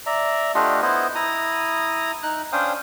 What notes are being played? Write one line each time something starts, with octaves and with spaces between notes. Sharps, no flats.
D5 E5 A#5
A3 D4 F4 G4 D#5 F#5
B3 E4 C5 D#5 F#5
E4 A#5 D#6
D#4 F#6
C#4 D4 C5 F5 G5 D#6